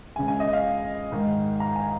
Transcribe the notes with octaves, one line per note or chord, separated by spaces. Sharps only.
C#2 C#3 G#3 G#5
G#5
D#5
F5
G#2 D#3 G#3
A#5
G#5